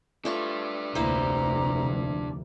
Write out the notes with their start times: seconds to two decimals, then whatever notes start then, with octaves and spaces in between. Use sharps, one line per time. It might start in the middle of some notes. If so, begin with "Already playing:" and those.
0.25 A3 D4 F4 B4 C#6
0.95 F1 D2 A#3 E4 C5 A#5